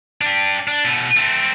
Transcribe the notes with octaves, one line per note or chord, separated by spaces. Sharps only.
D4 G4
D4
B2 A3
A3 C4